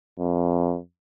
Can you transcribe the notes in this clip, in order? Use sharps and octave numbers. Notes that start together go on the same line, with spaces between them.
F2